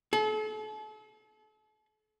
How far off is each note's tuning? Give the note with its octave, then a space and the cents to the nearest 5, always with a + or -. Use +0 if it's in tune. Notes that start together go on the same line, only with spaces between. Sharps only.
A4 -40